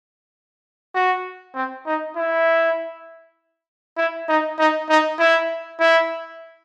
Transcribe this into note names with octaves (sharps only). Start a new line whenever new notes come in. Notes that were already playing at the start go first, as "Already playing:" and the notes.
F#4
C4
D#4
E4
E4
D#4
D#4
D#4
E4
E4